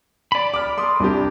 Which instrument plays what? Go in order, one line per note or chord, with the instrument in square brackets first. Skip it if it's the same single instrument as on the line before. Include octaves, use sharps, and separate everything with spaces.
[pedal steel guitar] D5 B5
[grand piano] D6 F6
C6 D6 D#6
C2 D4 G4